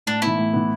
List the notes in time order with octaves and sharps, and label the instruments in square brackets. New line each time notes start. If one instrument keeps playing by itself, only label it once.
[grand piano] A2 [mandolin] D4
[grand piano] B3 [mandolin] E4
[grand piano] E3
A2
E3 B3